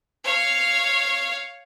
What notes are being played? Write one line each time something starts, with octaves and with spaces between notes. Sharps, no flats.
C#5 F5